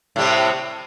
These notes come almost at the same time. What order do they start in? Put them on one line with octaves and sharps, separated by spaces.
A2 G3 C3